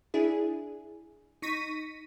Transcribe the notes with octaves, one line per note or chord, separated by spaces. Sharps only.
D4 E4 G#4
D#4 C#6 A#6 B6 D#7